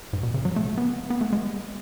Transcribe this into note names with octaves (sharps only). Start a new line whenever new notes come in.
G#2
B2
C#3
F#3
A3
B3
B3
A3
G#3